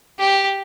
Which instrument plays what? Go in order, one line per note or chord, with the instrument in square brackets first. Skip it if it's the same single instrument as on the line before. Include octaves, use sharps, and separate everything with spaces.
[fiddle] G4